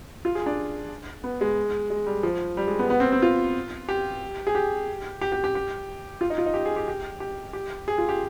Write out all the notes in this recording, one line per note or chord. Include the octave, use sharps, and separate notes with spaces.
F4
G#4
D4
B3
G#3
G#3
G3
F3
G3
G#3
B3
B3
C4
C4
F4
G4
G#4
G4
G4
G4
G4
G4
F4
D#4
F4
D#4
G4
G#4
G4
G4
G4
G4
G#4
F4
G4